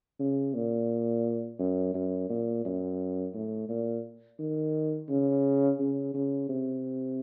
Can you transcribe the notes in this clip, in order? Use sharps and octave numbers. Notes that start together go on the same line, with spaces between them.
C#3
A#2
F#2
F#2
A#2
F#2
A2
A#2
D#3
C#3
C#3
C#3
C3